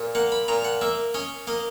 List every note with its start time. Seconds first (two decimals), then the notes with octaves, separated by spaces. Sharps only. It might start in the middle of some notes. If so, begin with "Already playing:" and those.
Already playing: A#2
0.15 A#3 F#5
0.32 B5
0.48 A#2 A#5
0.64 F#5
0.81 A#3 E5
1.14 C#4 D#5
1.47 A#3 D#5